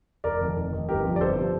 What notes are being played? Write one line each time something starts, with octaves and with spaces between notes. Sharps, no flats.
F1 A#4 D5
F2 D#3
F1
F2 D#3
G1 G4 A#4
F2 C3 F3
D5
G1 A4 C5
C3 F3